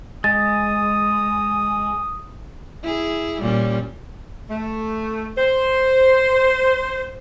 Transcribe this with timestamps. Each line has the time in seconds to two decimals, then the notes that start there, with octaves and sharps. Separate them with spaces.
0.24 G#3 D#6 A6
2.83 E4 G#4
3.41 A#2 G3 C#4
4.50 A3
5.38 C5